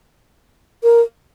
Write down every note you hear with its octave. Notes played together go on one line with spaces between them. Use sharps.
A#4